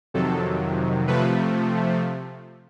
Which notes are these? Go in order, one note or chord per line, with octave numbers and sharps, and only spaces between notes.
F2 C3 D#3 F#3 A4
C3 F3 A3 B4